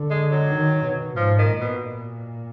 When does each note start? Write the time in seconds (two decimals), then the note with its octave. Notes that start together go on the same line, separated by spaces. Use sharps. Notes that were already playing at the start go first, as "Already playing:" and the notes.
Already playing: D3
0.10 G#3
0.32 F#3
0.53 D#3
0.85 B2
1.16 G#2 F3
1.38 D#3
1.49 A#2
1.60 B2